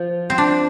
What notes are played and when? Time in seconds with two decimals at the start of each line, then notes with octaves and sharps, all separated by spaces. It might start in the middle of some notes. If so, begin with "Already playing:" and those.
Already playing: F3
0.30 C4
0.38 D4